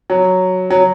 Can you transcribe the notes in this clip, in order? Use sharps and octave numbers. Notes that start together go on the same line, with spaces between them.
F#3
F#3